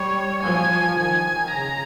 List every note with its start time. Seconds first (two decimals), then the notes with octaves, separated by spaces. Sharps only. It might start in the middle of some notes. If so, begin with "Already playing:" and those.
Already playing: G3 C#5
0.43 F3 G#5
0.99 D#3 G#5
1.54 C#3 A#5